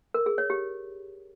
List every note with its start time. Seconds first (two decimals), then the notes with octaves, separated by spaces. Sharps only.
0.14 A#4
0.26 G#4
0.38 C#5
0.50 G4